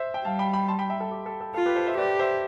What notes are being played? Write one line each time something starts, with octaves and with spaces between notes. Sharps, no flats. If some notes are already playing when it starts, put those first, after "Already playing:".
Already playing: C5 E5
E5 G5
G3 F5 A5
G5 B5
G5 B5
A5 C6
G5 B5
E5 G5
A4
G4
A4
A4
F4 A4
G4 B4
A4 C5
C5 E5
G4 B4 D5
C5 E5